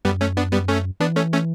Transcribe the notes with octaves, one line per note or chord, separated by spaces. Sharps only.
F#2 G3 B3
A3 C#4
B3 D4
G3 B3
A3 C#4
E3 B3 D4
A3 C#4
A3 C#4